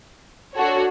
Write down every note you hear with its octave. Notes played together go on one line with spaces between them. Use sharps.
D4 F#4 A4 C#5